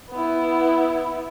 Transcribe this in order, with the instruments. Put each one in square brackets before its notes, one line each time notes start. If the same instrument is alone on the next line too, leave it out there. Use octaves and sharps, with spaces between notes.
[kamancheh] B3 E4